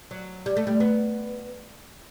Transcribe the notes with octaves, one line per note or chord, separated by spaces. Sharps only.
F#3
G3
A3
G3
B3